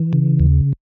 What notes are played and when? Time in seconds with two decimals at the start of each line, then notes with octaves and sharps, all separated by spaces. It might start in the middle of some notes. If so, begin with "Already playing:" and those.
Already playing: E3
0.13 C#3
0.40 D#2